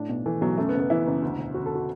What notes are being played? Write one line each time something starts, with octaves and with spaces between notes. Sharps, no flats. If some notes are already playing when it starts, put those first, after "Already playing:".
Already playing: A2 D4
B1
E3 A3
B1 F#3
F#2 A3
B3
F#1
B3
E3 E4
F#1
D2
E1
D3 F#4
A4
F#4